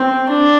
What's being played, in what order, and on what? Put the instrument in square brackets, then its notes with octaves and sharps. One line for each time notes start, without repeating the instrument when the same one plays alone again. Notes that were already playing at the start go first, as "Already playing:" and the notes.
Already playing: [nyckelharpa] C4
D4